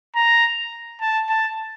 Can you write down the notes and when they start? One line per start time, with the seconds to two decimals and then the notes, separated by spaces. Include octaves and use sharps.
0.16 A#5
1.01 A5
1.29 A5